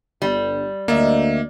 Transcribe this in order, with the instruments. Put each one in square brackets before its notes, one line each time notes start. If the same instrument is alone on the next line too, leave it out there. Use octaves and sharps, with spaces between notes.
[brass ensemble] G1 [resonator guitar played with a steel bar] G3
[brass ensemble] D2 [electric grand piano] A#3 [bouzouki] D#4 D5 E5